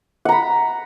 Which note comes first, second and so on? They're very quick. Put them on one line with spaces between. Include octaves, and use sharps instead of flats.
F#5 A#5 B5